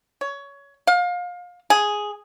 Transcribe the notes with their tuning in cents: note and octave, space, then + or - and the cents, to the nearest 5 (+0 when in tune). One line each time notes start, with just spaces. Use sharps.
C#5 +20
F5 +30
G#4 +0